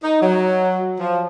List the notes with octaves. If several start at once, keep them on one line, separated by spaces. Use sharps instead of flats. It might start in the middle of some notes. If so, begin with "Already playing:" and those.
D#4
F#3
F3